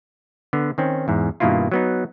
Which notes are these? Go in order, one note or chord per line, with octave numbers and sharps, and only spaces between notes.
D3 B3
D#3 C4 C#4
E2 G#2
G2 B2 D#3 A#3 E4 F4
F#3 B3 D#4